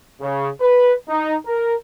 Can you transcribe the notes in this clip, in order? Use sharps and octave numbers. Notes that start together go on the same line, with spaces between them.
C#3
B4
D#4
A#4